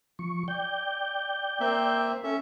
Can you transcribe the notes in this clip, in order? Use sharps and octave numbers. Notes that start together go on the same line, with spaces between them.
F3 C#6
D5 G5 G6
A#3 C4 E5
C#4 A4 E5